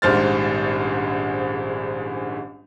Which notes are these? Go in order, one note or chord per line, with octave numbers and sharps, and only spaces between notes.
D#1 A#1 G#2 C5 F6 A6